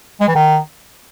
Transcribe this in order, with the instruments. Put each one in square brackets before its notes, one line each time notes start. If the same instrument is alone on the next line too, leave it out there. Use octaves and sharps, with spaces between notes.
[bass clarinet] G#3
E3
D#3